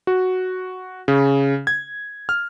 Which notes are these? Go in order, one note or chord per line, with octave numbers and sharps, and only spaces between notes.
F#4
C#3
G#6
F6